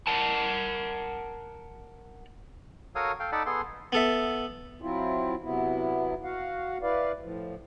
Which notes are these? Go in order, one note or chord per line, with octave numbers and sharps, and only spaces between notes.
A#4 F#5 A5
F#4 A4 A#4 C#5 F5 D#6
A4 F5 G5
D#4 A4 D5 F#5 A5 B5
B3 G#4 A4 C6
B3 A4 E5
F#3 C4 E4 F4
C3 F#3 B3 E4
F#4 F5 F#5
E4 B4 D5 F5
A2 F3